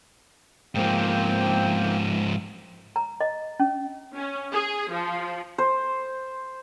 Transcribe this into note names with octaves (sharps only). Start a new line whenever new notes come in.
G#2 F3 A#3 C4 G5
A#5
D#5
C#4
C#4
G#4
F3
C5